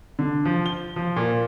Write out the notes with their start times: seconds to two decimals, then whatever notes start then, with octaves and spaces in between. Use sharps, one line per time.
0.19 D3
0.45 F3
0.66 G7
0.96 F3
1.16 A#2